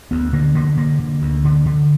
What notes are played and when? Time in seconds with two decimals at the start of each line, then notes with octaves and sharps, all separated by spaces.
0.11 D2 B3
0.33 D3 A#3
0.55 D3 A#3
0.77 D3 A#3
0.99 D3
1.22 D2
1.44 D3
1.66 D3